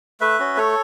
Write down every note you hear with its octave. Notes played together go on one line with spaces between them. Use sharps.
A3 B4 E5
C#4 F#4
A3 A4 C#5